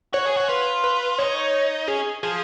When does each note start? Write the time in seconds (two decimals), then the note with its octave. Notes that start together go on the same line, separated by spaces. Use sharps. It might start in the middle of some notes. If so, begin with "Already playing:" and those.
0.13 F#4 C#5
0.26 G#4
0.37 F#4 C#5
0.49 F4 B4
0.84 B4
1.18 D#4 C#5
1.88 C#4 G#4
2.23 F3 G#4